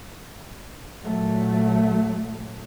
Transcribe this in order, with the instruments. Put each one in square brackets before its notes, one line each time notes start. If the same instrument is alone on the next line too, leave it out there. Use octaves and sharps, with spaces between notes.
[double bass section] A#2 F#3 A3